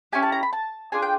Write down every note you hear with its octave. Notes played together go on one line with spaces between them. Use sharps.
C#4 E4 G4 G#5
A5
A#5
B5
A5
D4 F4 G#4 G#5
G5